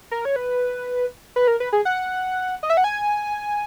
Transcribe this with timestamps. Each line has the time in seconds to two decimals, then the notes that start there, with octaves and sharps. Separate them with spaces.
0.11 A#4
0.25 C#5
0.36 B4
1.36 B4
1.47 A#4
1.60 B4
1.73 G#4
1.85 F#5
2.63 D#5
2.70 E5
2.77 F#5
2.84 G#5